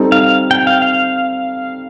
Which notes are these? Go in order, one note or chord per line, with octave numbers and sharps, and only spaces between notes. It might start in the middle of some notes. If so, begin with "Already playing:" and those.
Already playing: G3 C4 D#4 A4
F5
G5
F5
F5